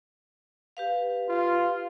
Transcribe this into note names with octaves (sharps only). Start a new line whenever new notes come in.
G4 B4 F5
F4